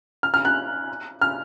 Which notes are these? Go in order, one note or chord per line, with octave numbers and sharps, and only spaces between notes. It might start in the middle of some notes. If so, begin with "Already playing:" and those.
F6
F6
F#6
F6